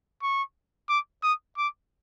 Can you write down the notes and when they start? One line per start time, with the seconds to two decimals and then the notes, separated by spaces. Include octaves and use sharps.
0.23 C#6
0.89 D6
1.23 D#6
1.57 D6